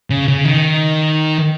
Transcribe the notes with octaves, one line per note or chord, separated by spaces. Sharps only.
C#3
C#3
D#3